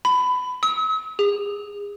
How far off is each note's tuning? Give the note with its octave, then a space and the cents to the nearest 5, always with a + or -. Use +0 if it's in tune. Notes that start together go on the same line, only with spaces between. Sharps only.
B5 +20
E6 -45
G#4 -30